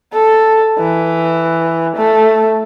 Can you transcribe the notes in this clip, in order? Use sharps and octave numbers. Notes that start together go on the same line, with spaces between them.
A4
E3
A3